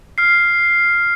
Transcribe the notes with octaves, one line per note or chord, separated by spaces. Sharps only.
F6 C7